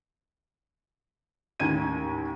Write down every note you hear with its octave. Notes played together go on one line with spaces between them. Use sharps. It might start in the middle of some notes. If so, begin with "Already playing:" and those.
D#2 A2 C#4 G#6 D#7